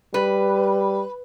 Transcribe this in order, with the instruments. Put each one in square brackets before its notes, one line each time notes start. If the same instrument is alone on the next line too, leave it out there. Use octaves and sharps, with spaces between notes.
[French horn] G3 [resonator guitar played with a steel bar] B4